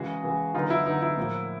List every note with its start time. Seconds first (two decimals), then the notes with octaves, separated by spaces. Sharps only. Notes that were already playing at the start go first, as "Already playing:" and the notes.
Already playing: C#3 E3 G#3 F#4 G#4
0.23 C#3 E3 G#3
0.54 D3 F#3 B3 D#4 F4
0.70 E4
0.86 D3 F#3 B3 D#4
1.02 E4
1.17 A2 F3 A#3